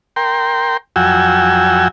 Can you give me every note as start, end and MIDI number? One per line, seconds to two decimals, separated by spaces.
0.16 0.77 70
0.16 0.77 79
0.16 0.77 84
0.96 1.88 41
0.96 1.88 54
0.96 1.88 66
0.96 1.88 79
0.96 1.88 80
0.96 1.88 88